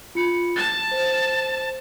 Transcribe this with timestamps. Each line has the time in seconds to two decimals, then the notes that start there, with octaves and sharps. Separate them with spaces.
0.15 F4 B5 C#7
0.56 A5 A6
0.91 C5